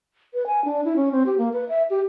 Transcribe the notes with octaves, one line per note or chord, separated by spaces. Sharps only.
B4
G#5
D4
E4
C#4
C4
G4
A#3
B4
E5
G4